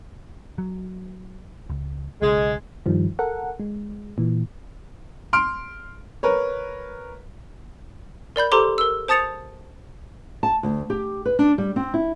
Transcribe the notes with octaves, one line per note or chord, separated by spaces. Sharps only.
F#3
C#2
B1 C#3 G#3
G2 D#3 F3 G3
A4 A#4 F#5
G#3
A#2 E3
C6 F6 D7
A#4 B4 C#5
A#4 D5 B5 G6
G4 A4 C5 A#5 C6 D6
A#4 E6
C5 A5 D#6 A6 C#7 F7
A5
D2
G4
B4
D4
G3
C4
E4